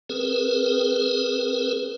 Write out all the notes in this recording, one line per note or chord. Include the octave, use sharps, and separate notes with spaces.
C4 G#4 A#4 B4